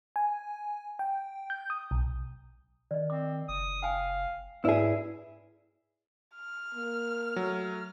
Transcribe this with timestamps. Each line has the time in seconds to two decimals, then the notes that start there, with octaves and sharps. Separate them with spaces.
0.16 G#5
0.99 G5
1.50 G6
1.70 D#6
1.91 B1
2.91 D#3 D5 D#5
3.10 C4 D6
3.48 F#1 D#6
3.82 F5 G5 G#5
4.65 G#2 E4 G#4 B4 C#5 D5 E5
6.36 F6
6.74 A#3
7.36 F#3 A3